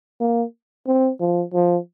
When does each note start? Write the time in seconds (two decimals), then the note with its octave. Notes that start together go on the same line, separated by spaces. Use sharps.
0.20 A#3
0.87 C4
1.20 F3
1.54 F3